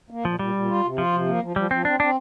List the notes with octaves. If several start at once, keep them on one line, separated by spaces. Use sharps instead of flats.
A#3
A#2 F3
A#2 G3
A#2
F4
C3
F3 F4
C3
A#3
F3
F3 G3
F3 C4
C4 D4
C4 D4